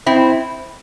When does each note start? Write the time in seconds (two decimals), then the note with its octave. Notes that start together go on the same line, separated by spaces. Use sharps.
0.06 C4 E4